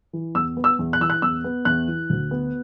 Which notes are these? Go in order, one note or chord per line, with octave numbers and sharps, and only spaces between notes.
E3
E2 E6
B3
E6
E2
F#6
E3 E6
F#6
E2 E6
B3
E2 F#6
E3
D2
B3